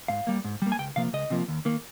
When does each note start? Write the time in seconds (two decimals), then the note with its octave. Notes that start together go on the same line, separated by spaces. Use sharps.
0.08 G#2 F5
0.27 G3 A#3
0.44 G#2
0.62 G3 A#3
0.72 G#5
0.79 C#2 G5
0.96 C3 F3 A#3 F5
1.13 C#2 D#5
1.30 C3 F3 A#3
1.48 D#2
1.65 D#3 A#3